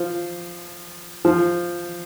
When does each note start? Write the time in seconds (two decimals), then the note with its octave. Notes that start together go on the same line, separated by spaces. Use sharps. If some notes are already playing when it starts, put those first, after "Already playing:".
Already playing: F3
1.25 F3